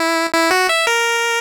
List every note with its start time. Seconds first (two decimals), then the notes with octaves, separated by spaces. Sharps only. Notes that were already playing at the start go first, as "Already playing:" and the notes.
Already playing: E4
0.33 E4
0.51 F#4
0.69 E5
0.87 A#4